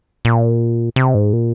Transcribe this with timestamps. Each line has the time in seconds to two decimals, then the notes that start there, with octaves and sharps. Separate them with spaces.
0.25 A#2
0.96 C3
1.15 G#2
1.33 A#2